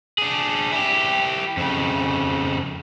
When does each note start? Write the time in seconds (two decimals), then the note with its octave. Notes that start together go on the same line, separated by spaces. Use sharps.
0.18 D4 G#4
0.72 E4 G4
1.57 F2 C#3